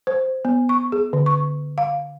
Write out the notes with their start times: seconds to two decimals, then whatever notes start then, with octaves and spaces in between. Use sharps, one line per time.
0.07 C5
0.45 B3
0.69 C#6
0.92 G#4
1.13 D3
1.26 C#6
1.78 F5